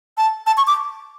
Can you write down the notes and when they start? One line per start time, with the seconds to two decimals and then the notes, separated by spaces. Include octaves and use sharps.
0.18 A5
0.47 A5
0.57 C#6
0.67 D6